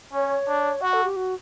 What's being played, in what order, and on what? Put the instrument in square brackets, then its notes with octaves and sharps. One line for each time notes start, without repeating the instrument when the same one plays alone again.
[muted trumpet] C#4 [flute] C#5
[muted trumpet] D4
[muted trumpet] F#4 [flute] F#5
[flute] A4
G4
F#4